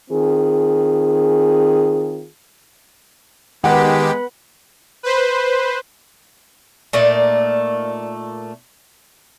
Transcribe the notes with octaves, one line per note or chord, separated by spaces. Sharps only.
D#3 C4 F4 G#4
D#3 G#3 B3 G4 B4 F#5
B4 C5
A#2 A3 D#4 D5